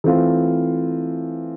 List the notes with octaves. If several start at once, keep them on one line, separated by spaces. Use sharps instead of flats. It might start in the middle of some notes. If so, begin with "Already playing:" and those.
E3 A3 C4 F4